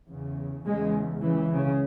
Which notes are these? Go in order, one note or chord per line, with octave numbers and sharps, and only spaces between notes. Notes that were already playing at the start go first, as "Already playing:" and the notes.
E2 C#3
E2 C#3 G#3
C#2 C#3 E3
C#3